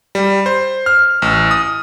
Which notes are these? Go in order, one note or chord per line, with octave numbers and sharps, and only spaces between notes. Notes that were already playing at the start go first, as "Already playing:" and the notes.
G3
C5
F6
A1
D#6